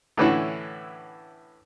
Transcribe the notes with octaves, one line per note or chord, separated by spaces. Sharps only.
A2 D3 E3 C#4 E4 F#4